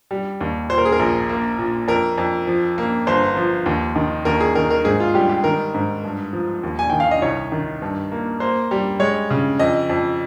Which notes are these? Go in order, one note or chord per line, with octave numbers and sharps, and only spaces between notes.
G3
D#2
A#2 C5
A#4
G#4
A#4
A#1
A#3
A#2
F2 A#4
F2
F3
A#3
G1 C5
F3
D#2
D#3
D#2 A#4
G#4
D#3 A#4
A#4
G#2 G#4
F4
G3 G4
G4
D#3 A#4
G#2
G2
F3
D#2
G#5
D#3 G5
F5
D#5
C2 C#5
D#3
G2
A#3
A#3 C5
G3
G#3 C#5
C#3
F2 D#5
F2